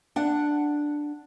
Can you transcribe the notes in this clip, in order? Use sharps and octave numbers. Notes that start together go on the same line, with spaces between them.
D4 F#5